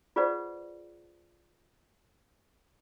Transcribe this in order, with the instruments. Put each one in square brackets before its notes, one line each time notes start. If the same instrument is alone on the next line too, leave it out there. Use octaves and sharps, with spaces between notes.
[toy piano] F4 G#4 B4 C5 D5 F#5